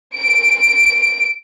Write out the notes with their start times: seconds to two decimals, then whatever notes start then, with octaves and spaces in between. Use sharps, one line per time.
0.15 D7